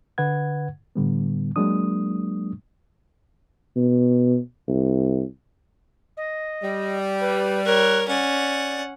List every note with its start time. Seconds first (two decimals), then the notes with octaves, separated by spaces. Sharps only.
0.18 D3 B4 F#5 G#6
0.96 A2 D3 G3 B3
1.56 F#3 G#3 A#3 D4 D#6
3.77 B2
4.68 C2
6.17 D#5
6.63 G3
7.21 B4
7.66 A#4 C#5 F#6
8.08 C#4 D5 F#5